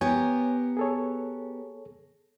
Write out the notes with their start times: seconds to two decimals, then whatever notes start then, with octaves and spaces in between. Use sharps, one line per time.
0.01 B3 G4 A#4 C#5 G#5
0.77 G#4 A4 C#5